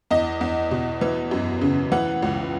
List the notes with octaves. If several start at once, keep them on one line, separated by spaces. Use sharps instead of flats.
E2 D#5
E2
B2
E3
F#2
C#3
E3 F#5
C#2